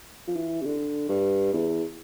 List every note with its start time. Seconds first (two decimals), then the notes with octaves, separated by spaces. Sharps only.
0.27 F3
0.36 E3
0.62 C3
0.65 D3
1.09 G2
1.53 E2